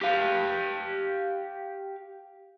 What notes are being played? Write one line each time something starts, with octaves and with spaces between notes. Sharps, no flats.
G4 F5